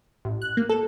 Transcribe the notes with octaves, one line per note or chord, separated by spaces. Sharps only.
A1
F#6
A#3
A4